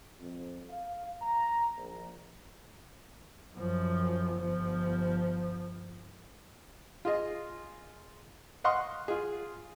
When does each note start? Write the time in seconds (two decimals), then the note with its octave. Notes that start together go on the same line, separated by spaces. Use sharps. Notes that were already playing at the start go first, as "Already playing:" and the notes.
0.20 F2
0.69 F5
1.21 A#5
1.78 A#1
3.55 F#2 F3
4.37 G1 F3
7.05 F4 G#4 D#5
8.64 D#5 F5 F#5 C6 C#6 D#6
9.08 F4 G#4